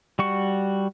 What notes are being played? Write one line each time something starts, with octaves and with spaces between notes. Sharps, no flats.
G3 F#4 C#6